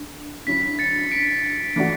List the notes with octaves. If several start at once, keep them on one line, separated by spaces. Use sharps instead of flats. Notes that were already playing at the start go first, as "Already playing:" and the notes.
Already playing: D3
D3 F#3 C#4 E4 B6
A6 C#7
B6 D7
E3 A3 D4 F#4